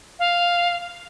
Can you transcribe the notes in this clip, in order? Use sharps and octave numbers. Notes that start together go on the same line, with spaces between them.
F5